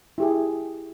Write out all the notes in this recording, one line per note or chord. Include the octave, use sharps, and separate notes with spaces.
E4 G4 G#4